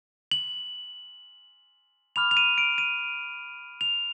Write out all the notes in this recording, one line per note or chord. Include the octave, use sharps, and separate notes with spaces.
F#7
B5 D6 F6 F7
F7
D#7
D7
D#7
F7